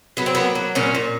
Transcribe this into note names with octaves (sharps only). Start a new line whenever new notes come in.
F#3 B3
C4
A#3 B3
F#3
A#2 C#4
A#2